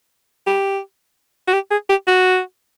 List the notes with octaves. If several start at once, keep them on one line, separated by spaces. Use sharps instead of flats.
G4
F#4
G4
G#4
G4
F#4